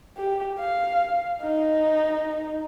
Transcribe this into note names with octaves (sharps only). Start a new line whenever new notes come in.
G4
F5
D#4